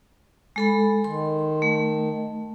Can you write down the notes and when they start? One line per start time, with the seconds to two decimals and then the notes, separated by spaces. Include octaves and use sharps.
0.56 G#3 A4 B5
1.04 D#3 C6
1.62 A3